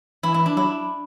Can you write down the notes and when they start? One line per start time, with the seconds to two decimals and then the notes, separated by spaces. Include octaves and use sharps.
0.23 E3 E4
0.34 E4
0.46 D4
0.57 F#3 E4